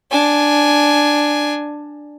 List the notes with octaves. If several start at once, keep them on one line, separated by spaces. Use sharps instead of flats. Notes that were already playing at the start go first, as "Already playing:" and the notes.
D4 G#5